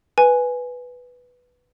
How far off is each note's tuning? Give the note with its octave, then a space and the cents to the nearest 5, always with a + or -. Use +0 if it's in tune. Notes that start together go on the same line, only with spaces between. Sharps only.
B4 +0 G#5 +0